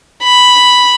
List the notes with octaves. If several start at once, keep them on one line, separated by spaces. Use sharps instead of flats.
B5